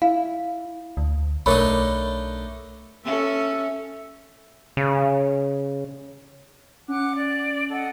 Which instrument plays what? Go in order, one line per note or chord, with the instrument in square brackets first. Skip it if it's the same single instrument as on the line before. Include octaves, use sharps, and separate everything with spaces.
[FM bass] E4 [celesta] F5
[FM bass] D2
[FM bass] B1 [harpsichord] A3 D4 D#4 [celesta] A#4 C#5 B5
[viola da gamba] C#4 [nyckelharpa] A4 E5
[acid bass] C#3
[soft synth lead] C#4 [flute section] F#5 D6 F#6
[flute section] D5
A4 D#5 F#5